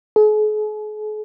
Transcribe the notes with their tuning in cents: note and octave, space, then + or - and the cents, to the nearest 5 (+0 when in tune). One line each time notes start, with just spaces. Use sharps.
G#4 +45